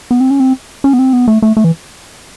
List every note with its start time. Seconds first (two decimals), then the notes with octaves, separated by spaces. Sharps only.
0.11 B3
0.21 C4
0.30 C#4
0.40 C4
0.84 C#4
0.93 B3
0.99 C4
1.13 B3
1.28 A3
1.42 A3
1.57 A3
1.64 E3